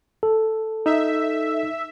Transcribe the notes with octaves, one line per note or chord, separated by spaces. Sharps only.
A4
D#4 E5